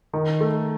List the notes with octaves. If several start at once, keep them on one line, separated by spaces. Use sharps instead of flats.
D#3
A3